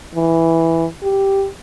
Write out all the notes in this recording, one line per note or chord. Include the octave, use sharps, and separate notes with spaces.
E3
G4